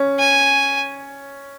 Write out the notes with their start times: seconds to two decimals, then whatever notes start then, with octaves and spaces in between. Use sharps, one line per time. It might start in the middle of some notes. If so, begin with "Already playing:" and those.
Already playing: C#4
0.19 G#5